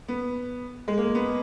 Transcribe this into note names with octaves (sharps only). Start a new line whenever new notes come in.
B3
G#3
A#3
B3